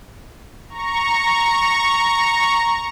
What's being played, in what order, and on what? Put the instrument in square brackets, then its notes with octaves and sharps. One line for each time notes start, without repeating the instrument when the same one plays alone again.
[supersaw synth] A#5 C#6